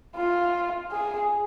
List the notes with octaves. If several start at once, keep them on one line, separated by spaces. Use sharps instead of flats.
F4
G#4